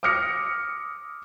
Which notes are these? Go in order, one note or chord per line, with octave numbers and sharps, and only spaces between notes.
D6 D#6 F6 A#6 C#7